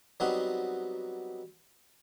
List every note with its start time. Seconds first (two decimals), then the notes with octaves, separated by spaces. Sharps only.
0.20 F#3 G3 B3 C4 D#4 F#4